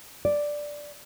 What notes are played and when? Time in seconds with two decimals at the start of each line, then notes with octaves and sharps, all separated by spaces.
0.25 D5